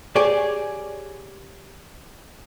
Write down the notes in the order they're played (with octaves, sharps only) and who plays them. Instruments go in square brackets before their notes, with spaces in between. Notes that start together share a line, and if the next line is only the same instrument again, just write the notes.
[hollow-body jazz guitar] G4 G#4 C#5 D5 G#5